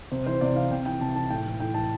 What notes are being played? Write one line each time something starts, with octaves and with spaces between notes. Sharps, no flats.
C3 C5
E3 C5
C3 D5
E3 F5
C3 G5
E3 G5
C3 A5
E3 A5
A2 G5
E3
A2 G5
E3 A5